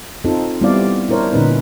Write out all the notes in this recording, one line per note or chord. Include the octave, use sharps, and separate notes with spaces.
C4 D#4 F4 A4
G3 B3 C4 E4 D5 F5
D4 E4 A#4 C5 C#5
A#2 D3 C#4 D#4 B4